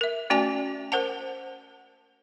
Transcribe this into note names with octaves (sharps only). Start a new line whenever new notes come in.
A#4 E5
A3 C#4 F#4 D5 G#5 A5
A#4 C5 F#5 A5